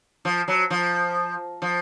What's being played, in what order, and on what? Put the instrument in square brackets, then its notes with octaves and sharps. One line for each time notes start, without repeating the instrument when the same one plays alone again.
[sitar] F3
F#3
F3
F3